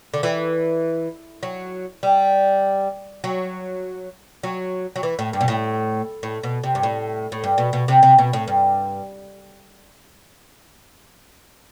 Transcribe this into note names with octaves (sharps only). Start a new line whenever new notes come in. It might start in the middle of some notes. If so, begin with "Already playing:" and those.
D3
E3
F#3
G3
F#3
F#3
F#3
E3
A2
G2
B2
A2
A2
B2
C3
G2
A2
A2
G2
B2
B2
C3
C3
B2
A2
G2